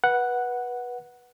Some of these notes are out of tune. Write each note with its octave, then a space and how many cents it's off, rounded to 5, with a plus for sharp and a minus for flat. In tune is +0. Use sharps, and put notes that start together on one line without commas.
B4 -20 F#5 +0